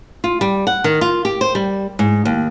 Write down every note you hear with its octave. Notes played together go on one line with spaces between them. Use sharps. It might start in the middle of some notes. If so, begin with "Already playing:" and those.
F4
G3
F#5
D#3
F4
G4
C5
G3
G#2
D#2